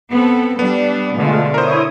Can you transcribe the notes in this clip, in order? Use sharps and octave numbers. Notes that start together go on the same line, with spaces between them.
B3 C4 A4
G3 B3 D4
B2 D3 G#3 A3 F4
E4 A#4 C5 C#5 D#6